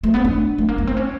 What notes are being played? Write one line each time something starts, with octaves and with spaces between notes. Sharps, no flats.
A3
B3
D4
A3
A#3
B3
C4
C#4